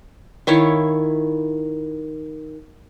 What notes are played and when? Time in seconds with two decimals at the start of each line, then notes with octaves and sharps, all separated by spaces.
0.47 D#3 E4 C#5 F5